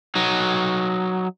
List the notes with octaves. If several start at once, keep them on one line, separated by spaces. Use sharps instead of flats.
F#3 D#4